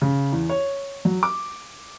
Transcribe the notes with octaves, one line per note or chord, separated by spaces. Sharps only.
C#3
E2
C#5
F#3
D6